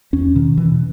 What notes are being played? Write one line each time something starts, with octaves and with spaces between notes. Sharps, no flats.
E2 C#4
B2 D#3
B2 E3